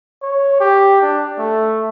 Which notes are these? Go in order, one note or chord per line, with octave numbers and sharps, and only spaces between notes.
C#5
G4
D4
A3